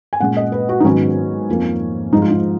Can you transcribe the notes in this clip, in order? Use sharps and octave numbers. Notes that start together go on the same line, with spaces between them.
G#5
A#2 G#3 C#4 F#5
D#5
B4
F#4
D#4
G#2 D#3 F#3 B3 C#4
F2 F3 A#3
G#2 F3 G#3 D#4
F4
D#4